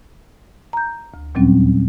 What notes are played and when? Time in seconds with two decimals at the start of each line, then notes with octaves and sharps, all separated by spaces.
0.73 A#5 G6
1.14 D2
1.35 D#2 A#2 F#3 G3 C4 C#4